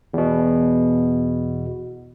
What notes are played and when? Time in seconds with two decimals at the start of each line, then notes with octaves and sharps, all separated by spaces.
0.14 E2 B2